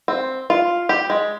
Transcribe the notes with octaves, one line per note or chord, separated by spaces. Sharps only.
C4
F4
G4
G#3